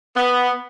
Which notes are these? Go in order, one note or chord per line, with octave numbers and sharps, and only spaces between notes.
B3